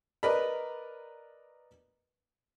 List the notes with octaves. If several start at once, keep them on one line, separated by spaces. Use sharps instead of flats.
A#4 B4 D5 D#5 B5